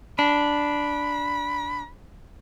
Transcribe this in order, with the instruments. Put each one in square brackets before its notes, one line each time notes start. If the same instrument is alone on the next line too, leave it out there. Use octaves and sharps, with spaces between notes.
[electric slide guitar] D4 [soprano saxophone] B5